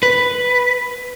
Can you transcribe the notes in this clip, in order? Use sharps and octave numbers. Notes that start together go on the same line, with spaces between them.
B4